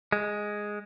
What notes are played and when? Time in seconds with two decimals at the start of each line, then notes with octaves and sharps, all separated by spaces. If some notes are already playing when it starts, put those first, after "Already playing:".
0.12 G#3